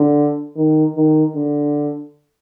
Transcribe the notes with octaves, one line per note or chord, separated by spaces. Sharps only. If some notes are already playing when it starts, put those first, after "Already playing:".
Already playing: D3
D#3
D#3
D3